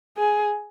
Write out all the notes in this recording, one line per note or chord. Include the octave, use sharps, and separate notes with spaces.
G#4